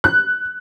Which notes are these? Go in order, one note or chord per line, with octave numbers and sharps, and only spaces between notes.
F#6